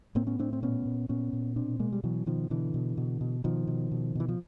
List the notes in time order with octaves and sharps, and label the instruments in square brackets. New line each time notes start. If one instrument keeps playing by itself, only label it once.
[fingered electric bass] A2 A#3 C4
B3 C#4
A2 C4 D4
C4
A#2 B3 C#4
A#2
A#2 B3 C#4
A#2
B2 C4 D4
B2 G#3 A#3
G3
B2 E3 F#3
B2 D#3 F3
B2 D3 E3
B2
B2
B2
B2 D#3 F3
B2
B2
B2 E3
F3